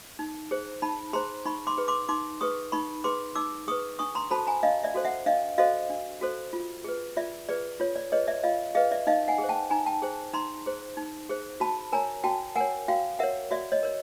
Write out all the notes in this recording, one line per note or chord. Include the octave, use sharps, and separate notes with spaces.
D#4
G#4 C5
D#4 A5 B5
G#4 C5 A#5 C6
D#4 B5 C#6
C6 D6
G#4 B4
C6 D6
D#4 C6 D6
G#4 B4 C#6 D#6
D#4 B5 C#6
G#4 B4 C6 D6
D#4 D6 E6
G#4 B4 C#6 D#6
D4 C#6 D#6
A#5 C6
F#4 A4 C5 A5 B5
G#5 A#5
D4 D#5 F5
D5 E5
F#4 A4 C5
E5 F#5
D4 D#5 F5
F#4 A4 C5 D#5 F5
D4
F#4 A4 C5
F4
G#4 B4
F4 D5 E5
G#4 B4 D5
F4 C#5
D5
G#4 B4 C#5 D#5
D5 E5
F4 D#5 F5
G#4 B4 D#5 F5
D5 E5
D#4 D#5 F5
F#5 G#5
G#4
C5
G5 A5
D#4 G#5 A#5
G5 A5
G#4 C5
D#4 A#5 C6
G#4 C5
D#4
G#4 C5
F#4 A5 B5
A#4 C#5 G#5 A#5
F#4 G5 A5
A#4 C#5 F#5 G#5
F#4 F5 G5
A#4 C#5 E5 F#5
F#4 D5 E5
C#5 D#5
A#4 C#5